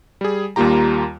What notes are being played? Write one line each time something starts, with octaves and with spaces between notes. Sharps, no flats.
G3 G#4
D#2 G3 A#3 F4 G4 A#5